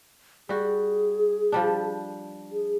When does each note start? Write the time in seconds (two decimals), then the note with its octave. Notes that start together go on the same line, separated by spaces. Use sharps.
0.49 G3 F#4 G#4
1.52 F3 G3 D4
2.52 G#4